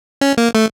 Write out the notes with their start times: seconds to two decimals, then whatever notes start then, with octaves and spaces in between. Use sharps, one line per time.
0.21 C#4
0.38 A#3
0.55 A3